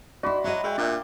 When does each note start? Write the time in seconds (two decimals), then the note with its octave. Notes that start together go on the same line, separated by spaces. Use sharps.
0.23 D#4 E4 F#4 D5 B5 C6
0.44 F#3 E4 D#5
0.63 G#3 E5 F#5 G5
0.78 A#2 D4 D5 E5 F5